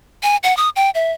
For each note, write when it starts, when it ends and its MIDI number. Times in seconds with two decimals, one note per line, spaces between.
0.23 0.36 80
0.44 0.55 78
0.57 0.69 87
0.76 0.90 79
0.95 1.12 76